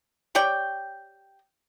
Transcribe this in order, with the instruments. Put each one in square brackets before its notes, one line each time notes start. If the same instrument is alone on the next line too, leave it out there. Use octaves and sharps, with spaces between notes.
[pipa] G4 C#5 D5 G5